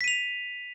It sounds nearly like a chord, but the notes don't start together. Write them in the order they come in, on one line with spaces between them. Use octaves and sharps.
B6 D#7 F7